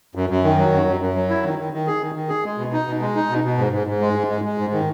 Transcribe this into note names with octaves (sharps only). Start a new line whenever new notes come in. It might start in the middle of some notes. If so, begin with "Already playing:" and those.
F#2
F#2
D#3
F#3
F#2
F#2
F#2
F#3
E4
D#3
D#3
D#3
G#4
D#3
D#3
G#4
G#3
B2
D#4
B2
G#3
D#4
B2
B2
G#2
G#2
G#2
G#3
G#2
G#3
G#3
G#2
D#3